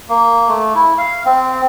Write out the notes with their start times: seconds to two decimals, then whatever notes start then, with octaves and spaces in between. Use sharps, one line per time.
0.09 A#3
0.48 A3
0.75 E4
0.98 F5
1.25 C4